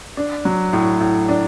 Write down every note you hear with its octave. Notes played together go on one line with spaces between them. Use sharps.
D4
F#3
A2
A2
D4